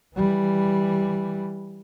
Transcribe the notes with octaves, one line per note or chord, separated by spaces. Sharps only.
E3 G3